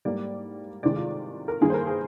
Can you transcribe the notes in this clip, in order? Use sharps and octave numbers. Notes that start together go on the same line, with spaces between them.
G#2 G3 A#3 D5
C3 D#3 G#3 D5
F4
A#4
G2 D#3 A#3 G#4
C5
A#4
G#4